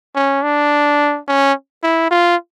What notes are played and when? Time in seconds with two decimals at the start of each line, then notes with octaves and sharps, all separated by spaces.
0.15 C#4
0.43 D4
1.28 C#4
1.83 E4
2.11 F4